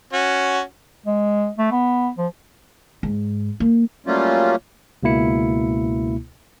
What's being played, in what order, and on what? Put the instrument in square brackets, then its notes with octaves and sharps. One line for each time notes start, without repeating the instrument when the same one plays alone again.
[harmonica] C#4 F#4
[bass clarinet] G#3
A3
B3
F3
[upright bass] G#2
A#3
[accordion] F#3 G3 A3 A#3 C#4 F4
[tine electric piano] C#2 B2 A#3 E4 C#7